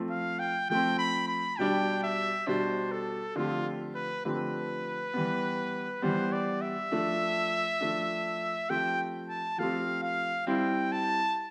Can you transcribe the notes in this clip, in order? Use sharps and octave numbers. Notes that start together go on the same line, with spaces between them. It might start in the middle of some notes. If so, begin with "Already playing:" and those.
Already playing: F3 A3 C4
F5
G5
F3 A3 C4 G5
B5
B5
B2 G3 D4 G4 G5
E5
B2 G3 D4 G4 C5
A4
D3 F3 A3 C4 F4 G4
B4
D3 F3 A3 C4 G4 B4
E3 G3 B3
E3 G3 B3 C5
D5
E5
F3 A3 D4
F3 A3 D4
F3 A3 C4 G4 G5
A5
F3 A3 C4 G4 F5
F5
G3 C4 E4 G5
A5